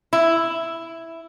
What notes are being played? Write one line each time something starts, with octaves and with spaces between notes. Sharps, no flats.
E4